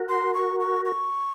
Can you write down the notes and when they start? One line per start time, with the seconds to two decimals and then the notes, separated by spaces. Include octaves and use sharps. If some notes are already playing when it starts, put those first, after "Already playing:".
Already playing: F#4 A#4
0.09 C6
0.34 C#6
0.60 C#6
0.85 C#6